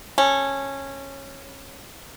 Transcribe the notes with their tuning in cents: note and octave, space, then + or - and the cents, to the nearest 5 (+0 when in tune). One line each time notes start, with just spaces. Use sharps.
C#4 -15 A4 -20